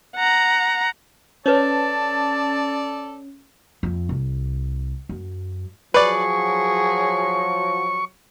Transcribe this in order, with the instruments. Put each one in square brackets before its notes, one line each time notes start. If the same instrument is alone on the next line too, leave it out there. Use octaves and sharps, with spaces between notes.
[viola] F#5 A#5
[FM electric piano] C#4 [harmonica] A4 D5 [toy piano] B4 C#5 [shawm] A5
[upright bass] F2
C2
F#2
[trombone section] F3 F#3 [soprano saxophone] G#4 [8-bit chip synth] B4 D5 [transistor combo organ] C#6